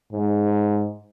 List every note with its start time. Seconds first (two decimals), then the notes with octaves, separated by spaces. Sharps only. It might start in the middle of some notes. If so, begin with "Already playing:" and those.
0.13 G#2